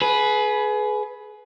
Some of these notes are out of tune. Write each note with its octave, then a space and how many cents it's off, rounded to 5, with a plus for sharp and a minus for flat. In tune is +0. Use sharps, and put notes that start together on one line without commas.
G#4 +30 B4 +0